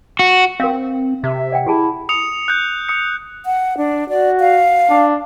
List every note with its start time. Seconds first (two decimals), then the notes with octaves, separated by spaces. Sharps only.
0.19 F#4
0.60 C4 A#4 F5
1.24 C3 E5
1.52 D5 F#5 G5
1.67 E4 G4 G#4 A5
2.09 D#6 C#7 F7
2.48 F#6 G6
2.89 D#6 C#7
3.46 F#5
3.77 D4
4.09 F#4 D5
4.40 F5
4.90 D4